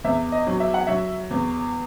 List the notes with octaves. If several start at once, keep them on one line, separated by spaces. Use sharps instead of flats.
E2 E5
D#5
F#3
E5
F#5
F#3 E5
E2